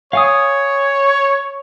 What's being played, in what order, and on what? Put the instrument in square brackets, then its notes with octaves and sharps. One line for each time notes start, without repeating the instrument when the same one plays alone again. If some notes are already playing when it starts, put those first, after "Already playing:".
[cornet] C#5 [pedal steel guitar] F5 G#5 D#6